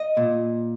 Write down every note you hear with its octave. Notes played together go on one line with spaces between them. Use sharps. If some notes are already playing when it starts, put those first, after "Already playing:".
Already playing: D#5
A#2